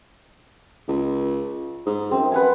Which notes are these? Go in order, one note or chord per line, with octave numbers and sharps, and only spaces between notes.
C#2
G#2
F#2 C4
B4 F#5 G#5